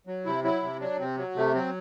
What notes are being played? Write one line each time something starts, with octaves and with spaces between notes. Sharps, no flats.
F#3
C3 E4
F#3 E4
C3
F#3 D4
C3 C4
F#3
C3 A3
F#3 C4